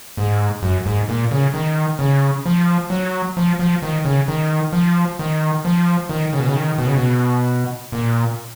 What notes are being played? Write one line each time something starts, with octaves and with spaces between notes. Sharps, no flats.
G#2
F#2
G#2
A#2
C#3
D#3
C#3
F3
F#3
F3
F3
D#3
C#3
D#3
F3
D#3
F3
D#3
C#3
B2
C#3
D#3
B2
C#3
B2
A#2